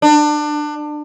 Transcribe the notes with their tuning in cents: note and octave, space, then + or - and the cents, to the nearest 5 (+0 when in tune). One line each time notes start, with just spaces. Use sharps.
D4 +25